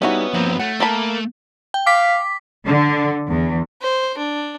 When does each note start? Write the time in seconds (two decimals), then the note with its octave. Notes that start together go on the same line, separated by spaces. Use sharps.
0.02 G3 B3 C#4 D#4 E4 F#4
0.34 G2 F3 A#3 C4
0.59 A3 F#5
0.80 A#3 A#4 A5 B5
1.74 G5
1.86 F5 D6 B6
2.65 D3
3.30 E2
3.82 C5
4.18 D4